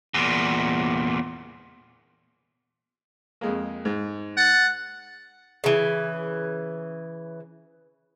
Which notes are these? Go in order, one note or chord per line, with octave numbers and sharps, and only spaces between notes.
E2 A#2
F2 G#3 A#3
G#2
F#5 A6
C#3 E3